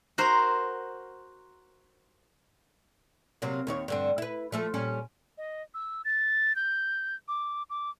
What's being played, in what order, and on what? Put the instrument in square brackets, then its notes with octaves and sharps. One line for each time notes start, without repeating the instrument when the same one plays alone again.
[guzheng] F#4 A#4 C5
[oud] C3 F#3 A#3
D#2 D#3 C#5
G2 D3 C4
E4 B4
F3 A3 A4
A#2 G3 C#4
[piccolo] D#5
E6
A6
G6
D6
D6